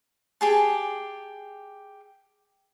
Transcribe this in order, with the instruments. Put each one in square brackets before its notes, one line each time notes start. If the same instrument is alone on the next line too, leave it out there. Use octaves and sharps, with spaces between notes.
[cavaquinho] G4 G#4 A5